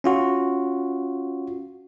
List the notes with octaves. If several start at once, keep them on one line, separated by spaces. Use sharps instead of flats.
C#4 F4 F#4